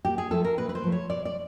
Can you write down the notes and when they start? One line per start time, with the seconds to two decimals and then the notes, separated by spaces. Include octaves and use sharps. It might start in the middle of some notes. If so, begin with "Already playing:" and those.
0.05 A#2 G4
0.18 G#4
0.31 F3 A3 A4
0.44 A#4
0.57 A#2 B4
0.69 B4
0.75 C5
0.84 F3 A3
0.92 C#5
1.10 B2 D5
1.25 D5